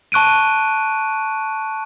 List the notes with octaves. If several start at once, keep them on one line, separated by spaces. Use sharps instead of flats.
A5 C#6 F#6 D7 D#7